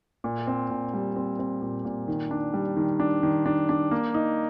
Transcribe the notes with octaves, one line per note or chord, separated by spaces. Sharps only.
A#2
C4
A#2
G3
C4
C4
A#2
A#2
D#3
D4
G3
D#3
D4
D#3
D4
D4
A#3
D#4